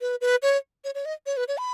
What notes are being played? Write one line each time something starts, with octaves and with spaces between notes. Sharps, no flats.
B4
B4
C#5
C#5
C#5
D#5
C#5
B4
C#5
B5